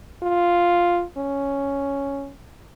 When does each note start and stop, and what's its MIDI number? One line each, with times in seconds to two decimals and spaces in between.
0.23 1.04 65
1.17 2.31 61